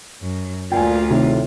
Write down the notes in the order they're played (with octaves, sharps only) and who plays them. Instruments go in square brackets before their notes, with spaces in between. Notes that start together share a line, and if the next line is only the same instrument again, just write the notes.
[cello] F#2
[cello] D2 F4 [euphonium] A#2 [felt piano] G5 G#5
[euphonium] A2 [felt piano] C3 D#3